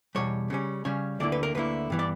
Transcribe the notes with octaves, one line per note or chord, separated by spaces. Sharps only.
E2 B2 G3 C#5
C#3 G3 C#4
C#3 G3 C#4 C#5
D2 D3 A#3 E4 D5
B4
A#4
D2 D3 A#3 E4 B4
G2 E3 B3
D5